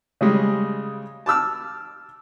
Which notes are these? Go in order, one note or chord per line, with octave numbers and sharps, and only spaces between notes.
C#3 G3 G#3
A5 D6 E6 F6